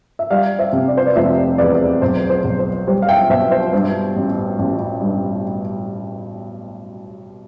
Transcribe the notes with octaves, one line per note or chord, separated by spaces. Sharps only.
E5
G3 D5 F5
C5 E5
C3
D5
C5
B4 D5
F1 C5 E5
E2 B4 D5
B1 C5
C5
B1
C5
G3 C5
F5
E5 G5
B2 C5 E5
C5 E5
G2 C5 E5
A1
A1
G2